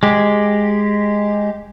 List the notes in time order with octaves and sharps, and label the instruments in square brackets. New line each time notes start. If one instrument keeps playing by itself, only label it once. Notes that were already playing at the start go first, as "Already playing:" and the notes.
[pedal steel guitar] G#3 G4